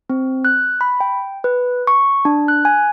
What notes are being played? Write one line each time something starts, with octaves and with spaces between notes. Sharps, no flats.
C4
F#6
B5
G5
B4
C#6
D4
F#6
G#5